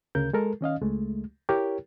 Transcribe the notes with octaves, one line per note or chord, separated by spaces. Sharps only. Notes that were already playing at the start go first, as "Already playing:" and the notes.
D2 C#3 A#4 G6
G#3 A4 A#4
D#3 C#4 D#5 F5
C#2 G#3 A3
E4 G4 A#4 C#5